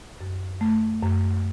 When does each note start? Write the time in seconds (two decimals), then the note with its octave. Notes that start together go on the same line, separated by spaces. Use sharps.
0.21 F#2
0.61 A3
1.03 F#2